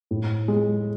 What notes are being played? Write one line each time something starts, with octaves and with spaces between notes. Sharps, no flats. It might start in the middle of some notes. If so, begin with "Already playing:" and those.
A2
G#3